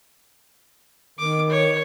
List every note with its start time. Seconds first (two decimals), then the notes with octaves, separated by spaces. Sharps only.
1.19 D#3 D6
1.50 C#5